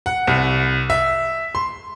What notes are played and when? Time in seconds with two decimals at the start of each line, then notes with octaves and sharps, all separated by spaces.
0.06 F#5
0.27 C2
0.90 E5
1.55 C6